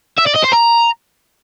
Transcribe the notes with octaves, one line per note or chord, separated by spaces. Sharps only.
E5
D5
D#5
C5
A#5